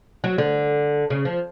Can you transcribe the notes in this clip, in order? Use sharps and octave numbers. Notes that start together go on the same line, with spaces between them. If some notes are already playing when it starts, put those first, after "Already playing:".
F#3
D3
C#3
F3